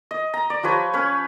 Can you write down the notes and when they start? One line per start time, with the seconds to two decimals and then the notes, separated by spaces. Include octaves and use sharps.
0.11 D#5
0.34 A#5
0.50 D5
0.63 F3 G4 B4 C#5
0.93 C#4 B4 C#5